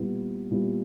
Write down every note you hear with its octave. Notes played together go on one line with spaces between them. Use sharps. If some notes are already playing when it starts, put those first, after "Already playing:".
Already playing: A#2 G3 B3 E4
A#2 G3 B3 E4